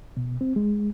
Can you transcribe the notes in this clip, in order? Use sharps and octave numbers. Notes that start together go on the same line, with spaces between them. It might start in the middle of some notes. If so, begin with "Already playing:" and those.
B2
C4
G#3